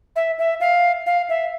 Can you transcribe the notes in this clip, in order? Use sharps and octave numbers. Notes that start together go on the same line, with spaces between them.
E5
E5
F5
F5
E5